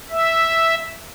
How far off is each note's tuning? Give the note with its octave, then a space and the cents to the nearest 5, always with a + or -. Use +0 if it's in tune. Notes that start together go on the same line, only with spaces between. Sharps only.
E5 -5